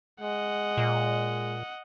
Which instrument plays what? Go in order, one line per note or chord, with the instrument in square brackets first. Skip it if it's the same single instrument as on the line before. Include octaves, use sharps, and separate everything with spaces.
[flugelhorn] G#3 [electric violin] D#5 F#5
[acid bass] A#2